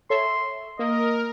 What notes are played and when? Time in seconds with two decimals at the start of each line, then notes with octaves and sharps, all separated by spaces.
0.10 A4 C#5 E5 C6
0.79 A#3 A#4 D#5